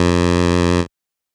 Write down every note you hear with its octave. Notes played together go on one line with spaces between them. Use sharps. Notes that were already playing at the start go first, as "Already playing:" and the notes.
Already playing: F2